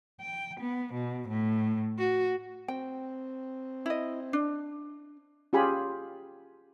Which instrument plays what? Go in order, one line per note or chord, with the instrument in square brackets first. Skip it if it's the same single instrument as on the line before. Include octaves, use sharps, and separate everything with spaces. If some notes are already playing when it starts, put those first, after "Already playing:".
[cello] G5
B3
B2
A2
F#4
[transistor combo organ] C4 [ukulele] G5
[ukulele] E4 D#5
D4
[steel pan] C#4 F4 G4 G#4 G#5 B5